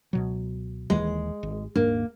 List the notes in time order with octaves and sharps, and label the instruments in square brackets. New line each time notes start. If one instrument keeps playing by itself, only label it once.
[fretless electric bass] C#2 B2 F#3
[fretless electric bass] D#1 D#2 E3 [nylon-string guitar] G#3
[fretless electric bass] G#1
[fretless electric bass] D#1 G#2 D4 [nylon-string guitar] A#3